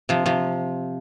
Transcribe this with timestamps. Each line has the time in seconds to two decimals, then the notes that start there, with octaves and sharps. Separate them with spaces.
0.09 C3 F3
0.26 C3 F3